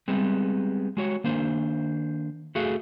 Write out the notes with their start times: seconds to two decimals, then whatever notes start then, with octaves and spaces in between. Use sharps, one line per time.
0.08 G3 G#3 B3 C4
0.97 G#3 F#4 C#5
1.24 D#3 A#3 D4 C5
2.55 A3 F#4 G#4 F5